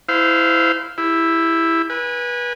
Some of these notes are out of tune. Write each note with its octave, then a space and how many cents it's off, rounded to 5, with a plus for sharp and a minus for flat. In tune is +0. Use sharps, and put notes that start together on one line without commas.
E4 +0 C5 -25 F5 +0
E4 +0 G4 +35
B4 -25 G#5 -25